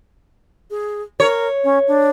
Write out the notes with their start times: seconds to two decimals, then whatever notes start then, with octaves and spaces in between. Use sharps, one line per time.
0.70 G#4
1.20 A#4 C#5
1.64 C#4
1.87 D4